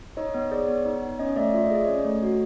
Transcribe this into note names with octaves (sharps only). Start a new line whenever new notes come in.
D#4 C#5 D#5
B3 C#5
G#4 C5 D5
B3 C#5
D#4
B3
C#4 C#5 D#5
A3 D5 E5
F4 E5
D#5
G#4 D5
C#4 C#5 D#5
A3
F#4